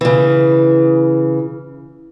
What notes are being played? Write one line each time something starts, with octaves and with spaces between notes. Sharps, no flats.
C#3 E3